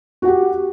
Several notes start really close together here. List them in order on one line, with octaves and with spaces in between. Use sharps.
F#4 F#5 G4